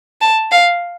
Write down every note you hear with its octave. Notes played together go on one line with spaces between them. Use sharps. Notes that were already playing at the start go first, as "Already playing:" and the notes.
A5
F5